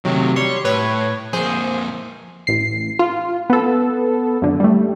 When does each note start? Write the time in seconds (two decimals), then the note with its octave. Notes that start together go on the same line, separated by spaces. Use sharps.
0.05 C3 D#3 F#3 A3
0.36 G3 C#5 C6
0.65 A2 B4 C#5
1.33 F2 A#3 G#4 C5
2.47 A1 C7
2.99 F4
3.50 B3 A4
4.42 F#2 D3
4.60 G3 A3